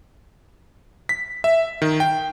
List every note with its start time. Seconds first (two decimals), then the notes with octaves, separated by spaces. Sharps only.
1.09 B6
1.44 E5
1.82 D#3
2.00 G5